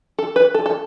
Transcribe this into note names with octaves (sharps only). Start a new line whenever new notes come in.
A4
B4
A4
A4